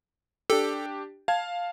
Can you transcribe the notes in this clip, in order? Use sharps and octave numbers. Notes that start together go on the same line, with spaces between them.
D4 G4 A4
F5 A5 G#6